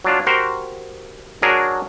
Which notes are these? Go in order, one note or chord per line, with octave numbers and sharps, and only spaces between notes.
F#3 D4 F4
F#4 G4 A#4 C5
F#3 D4 F#4 G#4 A#4